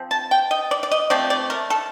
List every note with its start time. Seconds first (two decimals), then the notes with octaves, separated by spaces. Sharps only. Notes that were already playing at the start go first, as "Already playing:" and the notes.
Already playing: F3 C4
0.11 A5
0.31 G5
0.51 D#5
0.71 D5
0.83 D5
0.91 D#5
1.10 F3 A3 C4 D5
1.30 D5
1.50 A#4
1.70 A4